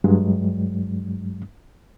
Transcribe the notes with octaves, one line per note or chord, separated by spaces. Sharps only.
G2 F#3 G#3